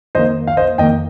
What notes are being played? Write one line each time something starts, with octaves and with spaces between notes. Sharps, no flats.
F2 D#3 A#3 C5 D#5
F5
C5 D#5
F2 D#3 A#3 D#5 G5